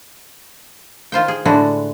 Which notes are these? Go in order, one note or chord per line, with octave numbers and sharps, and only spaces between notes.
D#3 F4 C5 G5
G#4
A2 D3 G#3 D4 E4 F#4